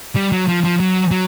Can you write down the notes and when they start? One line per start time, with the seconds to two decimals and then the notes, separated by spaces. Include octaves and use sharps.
0.16 G3
0.32 F#3
0.48 F3
0.64 F3
0.80 F#3
1.11 F#3